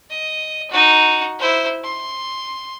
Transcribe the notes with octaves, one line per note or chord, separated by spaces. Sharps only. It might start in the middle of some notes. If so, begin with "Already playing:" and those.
D#5
D#4 F#4
E4 C5
C6